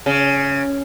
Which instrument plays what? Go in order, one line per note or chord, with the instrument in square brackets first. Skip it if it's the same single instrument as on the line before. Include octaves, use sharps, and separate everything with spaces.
[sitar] C#3